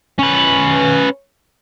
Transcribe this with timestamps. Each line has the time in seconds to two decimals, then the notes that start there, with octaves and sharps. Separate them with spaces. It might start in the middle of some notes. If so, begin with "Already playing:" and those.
0.19 C#4 B4